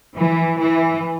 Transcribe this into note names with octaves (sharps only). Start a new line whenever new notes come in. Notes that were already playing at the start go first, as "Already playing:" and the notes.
E3
E3